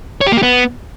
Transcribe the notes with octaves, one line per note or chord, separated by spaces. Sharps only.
C#5
G4
A#3
G4
B3